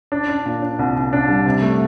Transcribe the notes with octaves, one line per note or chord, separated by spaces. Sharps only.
D4
D4
A#2
D4
C2
C2
D4
G3
C3
A3